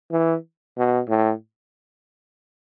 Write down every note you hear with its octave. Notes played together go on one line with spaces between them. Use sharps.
E3
B2
A2